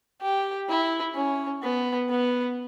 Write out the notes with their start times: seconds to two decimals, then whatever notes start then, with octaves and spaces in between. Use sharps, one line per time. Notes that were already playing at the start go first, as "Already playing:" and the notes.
0.21 G4
0.69 E4
1.15 C#4
1.62 B3
2.10 B3